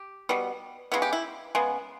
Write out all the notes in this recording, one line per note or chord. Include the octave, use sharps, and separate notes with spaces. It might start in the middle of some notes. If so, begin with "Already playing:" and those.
Already playing: G4
B2 G3 B3
C#3 G#3 B3 E4
G4
E4
C#3 G#3 B3